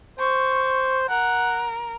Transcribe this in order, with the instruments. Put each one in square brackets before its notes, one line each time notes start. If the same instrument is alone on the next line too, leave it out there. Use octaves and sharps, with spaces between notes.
[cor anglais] C5 [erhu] C#6
[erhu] A#4 [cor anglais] F#5